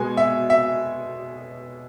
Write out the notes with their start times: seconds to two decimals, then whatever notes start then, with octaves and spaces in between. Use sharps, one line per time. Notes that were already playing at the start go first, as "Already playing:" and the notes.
Already playing: B2 G#3 B3 G#5
0.17 E5
0.50 E5